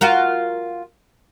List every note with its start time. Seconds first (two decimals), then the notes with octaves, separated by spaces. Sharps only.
0.01 F4 F#4 A#4